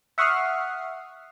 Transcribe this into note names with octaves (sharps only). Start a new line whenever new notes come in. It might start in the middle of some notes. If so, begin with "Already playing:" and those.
E5 F#5 C#6 D#6 F6 C7